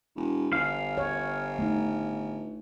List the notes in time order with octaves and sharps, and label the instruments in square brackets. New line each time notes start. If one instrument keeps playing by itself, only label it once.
[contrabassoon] E1
[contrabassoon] G1 [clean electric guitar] F5
[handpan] C#5
A3 D#4